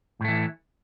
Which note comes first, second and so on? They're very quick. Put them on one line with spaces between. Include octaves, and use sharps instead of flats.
A2 A3 E3